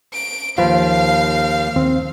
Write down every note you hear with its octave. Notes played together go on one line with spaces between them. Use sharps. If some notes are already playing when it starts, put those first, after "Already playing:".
D7
D#2 F3 B4 F5
D#2 C4